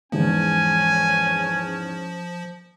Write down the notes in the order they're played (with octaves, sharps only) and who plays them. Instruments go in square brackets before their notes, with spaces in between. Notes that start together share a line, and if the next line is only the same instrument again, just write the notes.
[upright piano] E2 G#2 [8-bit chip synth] F3 [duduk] C#4 [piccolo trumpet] G#5